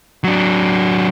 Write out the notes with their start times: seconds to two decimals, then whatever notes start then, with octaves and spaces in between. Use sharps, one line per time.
0.24 F#3 D4